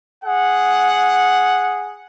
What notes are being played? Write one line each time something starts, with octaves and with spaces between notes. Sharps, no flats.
G#4 F#5